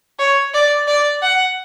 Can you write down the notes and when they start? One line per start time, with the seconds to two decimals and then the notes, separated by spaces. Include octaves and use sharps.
0.19 C#5
0.54 D5
0.88 D5
1.23 F#5